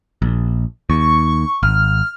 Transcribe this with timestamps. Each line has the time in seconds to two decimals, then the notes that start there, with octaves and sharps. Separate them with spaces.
0.22 A#1
0.90 D#2 C#6
1.63 G#1 F6